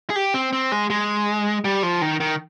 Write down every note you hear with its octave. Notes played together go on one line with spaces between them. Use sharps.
G#4
G4
C4
C4
G#3
G#3
G3
F3
D#3
D#3